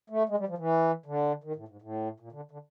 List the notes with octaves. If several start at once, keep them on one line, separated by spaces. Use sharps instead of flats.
A3
G#3
G3
F3
E3
D3
D#3
A2
G#2
A2
A#2
D3
D3